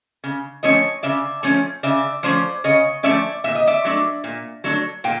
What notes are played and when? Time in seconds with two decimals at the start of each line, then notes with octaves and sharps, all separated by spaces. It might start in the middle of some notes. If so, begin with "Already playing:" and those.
0.24 C#3
0.63 F3 A3 C#4 C#5 D#5
1.03 C#3 D5 E5
1.43 F3 A3 C#4
1.83 C#3 D5 E5
2.23 F3 A3 C#4 C5 D5
2.64 C#3 C#5 D#5
3.03 F3 A3 C#4 D5 E5
3.44 A#2 E5
3.55 D#5
3.67 D5 E5
3.85 F#3 A3 D4
4.24 A#2
4.64 F#3 A3 D4
5.04 A#2 F5 G5